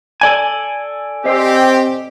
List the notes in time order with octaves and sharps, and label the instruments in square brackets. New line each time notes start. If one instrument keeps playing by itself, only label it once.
[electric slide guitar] A4 D5 G#5
[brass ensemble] C4 G4 [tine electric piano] C5 D#5 C7